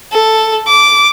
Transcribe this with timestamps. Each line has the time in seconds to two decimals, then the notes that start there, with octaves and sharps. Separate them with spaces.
0.11 A4
0.68 D6